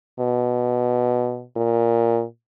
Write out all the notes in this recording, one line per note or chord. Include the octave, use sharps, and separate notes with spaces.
B2
A#2